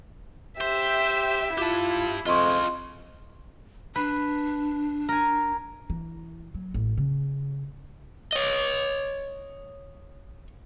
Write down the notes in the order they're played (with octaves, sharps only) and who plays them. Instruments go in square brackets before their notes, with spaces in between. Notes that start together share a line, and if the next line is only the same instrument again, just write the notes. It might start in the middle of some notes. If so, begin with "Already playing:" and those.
[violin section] G4 E5 [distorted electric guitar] C5
[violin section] E4 [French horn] F4 [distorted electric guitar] G4 A5
[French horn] F2 [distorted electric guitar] F4 G#4 [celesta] D#5 C6 C#6
[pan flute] D4 [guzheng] B4
[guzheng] A#4 G#5
[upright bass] E3
F#3
A1
C#3
[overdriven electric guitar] C#5 D#5